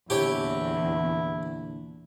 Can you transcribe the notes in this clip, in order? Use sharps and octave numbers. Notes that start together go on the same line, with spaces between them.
E2 A#2 D3 E4 G4 C#5 A5